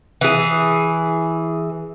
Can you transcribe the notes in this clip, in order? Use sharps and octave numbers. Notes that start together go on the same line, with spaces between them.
E3 G#4